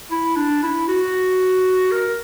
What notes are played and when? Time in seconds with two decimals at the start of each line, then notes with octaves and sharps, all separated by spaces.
0.11 E4
0.36 D4
0.63 E4
0.88 F#4
1.92 A#4